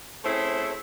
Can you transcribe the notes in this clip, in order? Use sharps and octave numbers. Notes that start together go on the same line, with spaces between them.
A3 C4 C#4 E4 G#4 C5